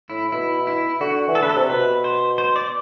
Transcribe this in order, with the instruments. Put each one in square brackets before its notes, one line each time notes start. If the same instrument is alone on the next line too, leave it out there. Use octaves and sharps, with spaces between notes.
[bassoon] A2 [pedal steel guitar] E4
[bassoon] B2 [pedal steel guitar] E4
[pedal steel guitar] E4
[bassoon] D3 [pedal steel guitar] F#4
[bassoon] E3
[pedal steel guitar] A4
[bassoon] D3 [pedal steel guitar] B4
[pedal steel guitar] A4
[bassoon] C3
[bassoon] B2 [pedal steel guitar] B4
[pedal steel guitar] C5
C5
D5